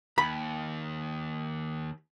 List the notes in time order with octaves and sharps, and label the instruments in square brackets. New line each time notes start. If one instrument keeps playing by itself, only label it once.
[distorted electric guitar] D#2 [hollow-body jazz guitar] B5